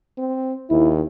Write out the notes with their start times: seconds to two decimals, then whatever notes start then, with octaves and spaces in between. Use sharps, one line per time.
0.18 C4
0.70 D#2 E4